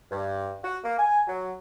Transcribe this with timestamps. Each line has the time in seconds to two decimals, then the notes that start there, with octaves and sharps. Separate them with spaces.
0.11 G2
0.63 F#4
0.84 A#3
0.98 G#5
1.27 F#3